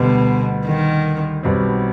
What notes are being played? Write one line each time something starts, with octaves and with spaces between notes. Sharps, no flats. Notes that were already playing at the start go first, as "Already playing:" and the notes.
Already playing: D2 B2 D3 G3
D#3
B1 B2 G3 C4